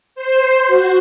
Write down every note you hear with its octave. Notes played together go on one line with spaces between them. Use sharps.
C5
F#4